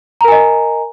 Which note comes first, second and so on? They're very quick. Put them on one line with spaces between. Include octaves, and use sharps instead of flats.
A#5 A#4 G#5 D#5